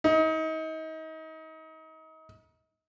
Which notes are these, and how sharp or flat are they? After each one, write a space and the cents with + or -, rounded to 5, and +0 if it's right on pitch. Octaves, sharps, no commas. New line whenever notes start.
D#4 +35